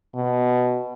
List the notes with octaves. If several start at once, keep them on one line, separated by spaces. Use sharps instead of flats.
B2